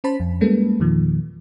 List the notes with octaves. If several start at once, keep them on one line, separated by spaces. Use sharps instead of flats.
C#4 C5 A5 B5
F2
G3 G#3 A#3 C#4 A4 B4
E2 A#2 D#3 F3